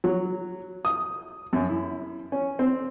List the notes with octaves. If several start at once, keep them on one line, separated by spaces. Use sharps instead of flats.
F#3
D#6
F#2
E4
C#4
C4